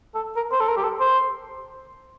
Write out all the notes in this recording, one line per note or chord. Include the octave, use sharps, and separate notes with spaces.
A4
A#4
C5
A4
A#4
G4
A4
C5